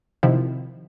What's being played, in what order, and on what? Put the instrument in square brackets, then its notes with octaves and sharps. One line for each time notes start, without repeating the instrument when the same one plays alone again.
[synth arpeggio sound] C3 D#3 F3 E4